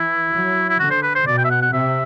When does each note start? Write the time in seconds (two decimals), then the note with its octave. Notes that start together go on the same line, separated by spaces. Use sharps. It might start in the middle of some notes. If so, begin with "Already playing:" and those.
Already playing: E3 E4
0.32 F#3
0.69 E4
0.79 D3 F#4
0.91 C5
1.03 B4
1.15 C5
1.27 B2 D5
1.38 G5
1.44 E5
1.50 F#5
1.62 F#5
1.73 C3 E5